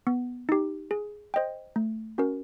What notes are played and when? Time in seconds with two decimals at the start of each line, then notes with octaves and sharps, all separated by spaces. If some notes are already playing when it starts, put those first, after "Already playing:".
0.07 B3
0.49 D#4 G4
0.91 G#4
1.34 C5 D#5 G5
1.76 A3
2.18 C#4 F#4 A#4